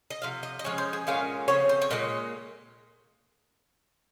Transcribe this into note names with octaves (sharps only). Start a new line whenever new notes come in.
D#5
C3 F3 F5
D#5
D#5
F3 G#3 C#4 C#5
C5
G#4
A#2 G#3 C#4 F5
C#3 F3 C4 C#5
C5
C#5
A#2 G#3 D#5